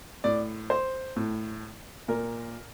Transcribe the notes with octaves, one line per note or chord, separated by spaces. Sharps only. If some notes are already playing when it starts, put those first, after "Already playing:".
A2 D5
C5
A2
A#2 A#4